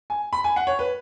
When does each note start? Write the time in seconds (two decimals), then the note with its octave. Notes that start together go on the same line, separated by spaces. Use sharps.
0.10 G#5
0.33 B5
0.44 G#5
0.56 F#5
0.67 C#5
0.79 B4